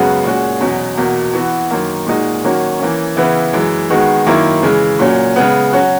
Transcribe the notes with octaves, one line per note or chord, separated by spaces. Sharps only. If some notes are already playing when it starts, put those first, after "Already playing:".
Already playing: F#2 C#3 G#3 B3 F#4
A#2 G#3 C#4 F#4
E2 B2 F#3 C#4
E2 B2 A#3
E3 B3 F#4
F#2 D#3 A#3
A#2 G#3 D#4 F#4
D#3 F#3 A#3 C#4 F#4
E3 A#3 C#4
C#3 E3 B3 E4
F#2 E3 G#3
D#3 G#3 B3 F#4
F#2 D#3 A#3 E4
C#3 E3 G#3
A#2 F#3 C#4
C#3 G#3 B3
F#3 C#4 F#4